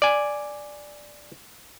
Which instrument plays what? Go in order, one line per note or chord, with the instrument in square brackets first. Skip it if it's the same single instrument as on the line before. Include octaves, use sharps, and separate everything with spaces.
[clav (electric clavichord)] D5 G#5